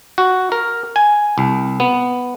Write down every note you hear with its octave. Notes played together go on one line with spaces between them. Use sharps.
F#4
A#4
G#5
C2
B3